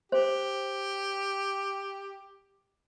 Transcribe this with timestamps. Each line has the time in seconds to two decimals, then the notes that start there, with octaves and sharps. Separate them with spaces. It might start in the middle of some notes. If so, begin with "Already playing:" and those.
0.12 G4 C5